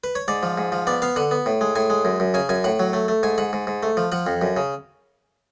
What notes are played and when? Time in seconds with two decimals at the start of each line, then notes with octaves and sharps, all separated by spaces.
0.04 B4
0.15 C#5
0.28 G#2 D5
0.43 F3
0.58 G#2
0.72 F3
0.87 B3 D5
1.02 B3 F5
1.16 D3 F#5
1.31 B3
1.46 A2
1.61 G#3
1.76 A2 G#5
1.90 G#3
2.05 F#2
2.20 F#2
2.34 C#3 G#5
2.49 F#2 G#5
2.64 A2 F#5
2.80 F#3
2.93 A3
3.08 A3
3.23 G#2 G#5
3.38 G#2 F#5
3.53 G#2
3.67 G#2
3.83 A3
3.97 F3
4.12 F3 F#5
4.27 F2
4.42 F#2
4.56 C#3